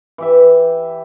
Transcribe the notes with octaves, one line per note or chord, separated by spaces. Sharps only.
E3 G4 E5